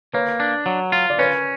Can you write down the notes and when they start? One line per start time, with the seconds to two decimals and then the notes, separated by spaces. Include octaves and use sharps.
0.14 A#3 B4 C#5
0.40 D4
0.66 F#3
0.92 F4
1.10 D5
1.18 C#4 B4 C#5